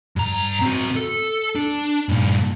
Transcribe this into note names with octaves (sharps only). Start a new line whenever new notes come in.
G2 A#5
C4 F#4
A4
D4
G2 A#2